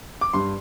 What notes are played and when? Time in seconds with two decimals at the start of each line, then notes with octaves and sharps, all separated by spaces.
0.21 D6
0.33 G2 C6